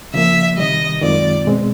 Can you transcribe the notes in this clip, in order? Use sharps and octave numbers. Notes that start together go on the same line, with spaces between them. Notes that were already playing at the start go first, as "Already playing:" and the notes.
C#3 F3 A#3 E5
C3 D#3 G3 D#5
F#2 D#3 G#3 C4 F4 D5
B2 G#3 C4